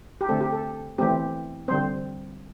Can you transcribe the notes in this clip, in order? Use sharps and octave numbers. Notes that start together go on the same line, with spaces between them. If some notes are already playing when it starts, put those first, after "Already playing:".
G4
D3 A3 C4 A4
G4
A4
E3 A3 C4 G4
D3 G3 C4 C5